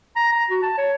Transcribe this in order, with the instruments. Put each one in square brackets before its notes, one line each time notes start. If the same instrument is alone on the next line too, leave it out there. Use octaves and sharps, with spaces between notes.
[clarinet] A#5
A#5
F#4
A5
C#5